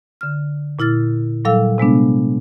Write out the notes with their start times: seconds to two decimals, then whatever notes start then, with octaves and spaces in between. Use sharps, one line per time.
0.21 D3 F6
0.79 A#2 E4 F6 A6
1.45 A#2 F#3 G3 A4 F5 E6
1.78 C3 G#3 B3 D4